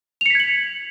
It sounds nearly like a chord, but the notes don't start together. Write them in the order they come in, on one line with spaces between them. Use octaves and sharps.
F7 C#7 B6 G#6 F#7